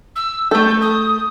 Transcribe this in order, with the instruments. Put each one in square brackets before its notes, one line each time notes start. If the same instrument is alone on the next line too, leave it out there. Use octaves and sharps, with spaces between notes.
[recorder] E6
[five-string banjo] A3 A4 [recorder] G6
[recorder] D#6